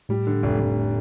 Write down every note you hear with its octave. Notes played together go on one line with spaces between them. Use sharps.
A2 G3
D3
F1
F1